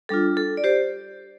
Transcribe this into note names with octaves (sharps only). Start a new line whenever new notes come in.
G3 D4 F4 A4
A4
D5
G4 C5